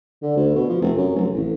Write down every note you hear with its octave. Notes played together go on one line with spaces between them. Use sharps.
D3
D2
B2
F3
F1
F#2
F1
A1